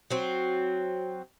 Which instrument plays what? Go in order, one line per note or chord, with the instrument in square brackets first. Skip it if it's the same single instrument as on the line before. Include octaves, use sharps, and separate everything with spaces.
[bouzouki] F#3 C4